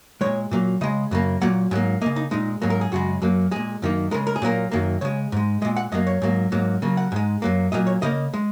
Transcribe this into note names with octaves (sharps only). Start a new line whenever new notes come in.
A#2 G#3 C#5
A#2 F#3 A#3
C#3 G#3 D#5
F#2 C#3 A#3
A#2 F#3 A#3 F#5
G#2 F#3 A#3
C#3 A#3 D#5
D#4
A#2 G#3 D#4
G#2 F#3 A#3
A#4
G#4
F#2 C#3 G#3 F#4
F#2 F#3 A#3
A#2 G#3 G#4
F#2 D#3 A#3
C#3 G#3 A#4
A#4
G#4
A#2 F#3 A#3 A#4
F#2 D#3 F#3 A#3
C#3 G#3 C#5
G#2 G#3
A#2 G#3 D#5
F#5
F#2 F#3 A#3 D#5
C#5
G#2 F#3 A#3
G#2 F#3 A#3
C#3 F#3 A#3
F#5
G#2 G#3
F#2 F#3 A#3
A#2 F#3 A#3 D#5
C#5
C#3 A#3 D#5
G#3